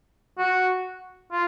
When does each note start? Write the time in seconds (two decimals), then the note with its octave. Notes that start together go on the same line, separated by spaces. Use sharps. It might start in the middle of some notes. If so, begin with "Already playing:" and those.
0.39 F#4
1.32 F4